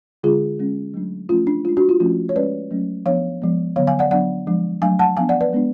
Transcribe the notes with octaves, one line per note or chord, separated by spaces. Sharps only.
D3 G#3 D4 F4 G#4
G#3 C#4
F#3 A3 D4
F3 A3 C#4 F4
D4
G#3 D4 F4
D4 F#4
F4
F3 A3 C#4 F4
C#5
G#3 C#4 B4 D5
F#3 A3 C#4
F3 B3 D4 C#5 F5
F3 G#3 B3
D3 F#3 B3 C#5 F5
F5 G#5
D5 F#5
F#3 B3 D4 D5 F#5
F3 G#3 D4
F#3 A3 D4 F5 G#5
F#5 A5
F3 B3 D4 F5 G#5
D5 F#5
B4 D5
G#3 B3 D4